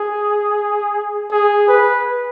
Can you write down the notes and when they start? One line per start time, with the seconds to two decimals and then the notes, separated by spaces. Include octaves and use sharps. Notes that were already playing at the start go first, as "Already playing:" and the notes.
Already playing: G#4
1.32 G#4
1.68 B4